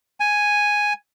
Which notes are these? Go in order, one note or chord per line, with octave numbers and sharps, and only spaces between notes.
G#5